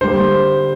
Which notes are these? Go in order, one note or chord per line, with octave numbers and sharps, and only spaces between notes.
D3 G3 A#3 C5